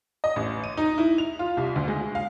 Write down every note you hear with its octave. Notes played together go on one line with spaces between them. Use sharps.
D#5
A1
D#7
D#4
E4
F7
F4
C2
D2
G#3
F5